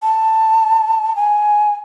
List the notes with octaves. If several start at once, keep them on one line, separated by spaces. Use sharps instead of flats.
A5
G#5